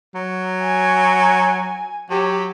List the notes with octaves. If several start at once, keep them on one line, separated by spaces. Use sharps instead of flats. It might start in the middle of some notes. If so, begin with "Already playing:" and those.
F#3
G#5
F#3 G4